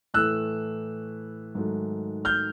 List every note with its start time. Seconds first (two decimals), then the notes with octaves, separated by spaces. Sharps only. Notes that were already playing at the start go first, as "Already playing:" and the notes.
0.14 A2 E3 A3 E6 F#6
1.55 G#2 D#3 F#3 A3
2.25 F6 G6